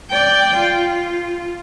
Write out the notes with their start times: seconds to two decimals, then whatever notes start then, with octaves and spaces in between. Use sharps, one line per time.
0.10 D5 G5
0.57 F4